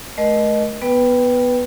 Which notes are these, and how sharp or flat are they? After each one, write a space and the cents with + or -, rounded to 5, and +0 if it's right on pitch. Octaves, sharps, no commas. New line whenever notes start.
A3 -30 A#4 +35 D#5 -10
B3 +0 B4 +0 G5 +0